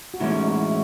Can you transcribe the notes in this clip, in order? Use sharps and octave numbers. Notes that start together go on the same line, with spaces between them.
F#4
A2 E3 G#3 C#4 E4
D#4
F#4
E4